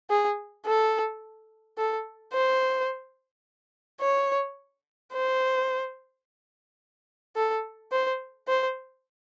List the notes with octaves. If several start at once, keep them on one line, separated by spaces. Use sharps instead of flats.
G#4
A4
A4
C5
C#5
C5
A4
C5
C5